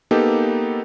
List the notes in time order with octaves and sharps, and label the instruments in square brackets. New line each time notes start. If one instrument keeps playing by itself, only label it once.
[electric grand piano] A#3 B3 D#4 G4 A4